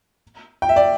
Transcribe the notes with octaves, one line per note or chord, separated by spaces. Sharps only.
G5
E5
D5